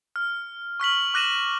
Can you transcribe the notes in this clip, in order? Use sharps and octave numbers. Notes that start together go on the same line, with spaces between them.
F6
C#6 F6 B6 F#7
D6 F#6 A#6 D#7 E7 F#7